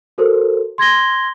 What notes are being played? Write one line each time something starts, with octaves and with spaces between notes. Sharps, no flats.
F#4 A4 A#4 C5
C6 G#6 A#6 G7